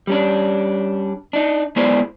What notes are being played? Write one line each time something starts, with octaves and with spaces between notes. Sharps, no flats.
G3 C#4 D4
D4 D#4
G#3 B3 E4 G#4 C5 D5